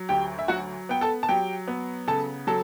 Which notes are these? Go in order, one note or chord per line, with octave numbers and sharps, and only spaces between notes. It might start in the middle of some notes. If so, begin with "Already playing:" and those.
Already playing: F#3
D2 G4 G5
E5
F#3 F#4 F#5
B3 G5
A4 A5
A5
F#3 G4 G5
B3
C#3 A4 A5
F#3 A4 A5